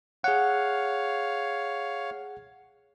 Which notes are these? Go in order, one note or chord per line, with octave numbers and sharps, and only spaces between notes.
G#4 C#5 F5 F#5